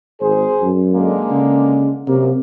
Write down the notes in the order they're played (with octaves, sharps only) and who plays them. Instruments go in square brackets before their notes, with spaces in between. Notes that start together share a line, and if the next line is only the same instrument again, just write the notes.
[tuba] G#1 [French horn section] G#4 C5
[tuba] F#2
[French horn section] D3 G#3 A#3
[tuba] C#3
[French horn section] F#2 A#3 [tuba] C3